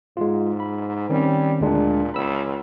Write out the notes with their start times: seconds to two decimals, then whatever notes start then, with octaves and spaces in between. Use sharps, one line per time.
0.17 G#2 G#3 F4
0.60 B5
1.10 D#3 G3 C4 C#4
1.61 D2 A#2 G#3 D4
2.14 C#2 B5 E6